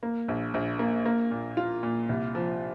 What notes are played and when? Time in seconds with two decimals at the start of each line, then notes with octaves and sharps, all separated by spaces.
0.03 A#3
0.28 A#1
0.54 A#1
0.79 A#3
1.05 A#3
1.31 A#2
1.57 F4
1.83 A#2
2.09 C2
2.35 F3